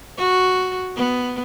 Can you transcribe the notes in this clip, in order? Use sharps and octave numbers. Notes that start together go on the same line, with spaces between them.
F#4
B3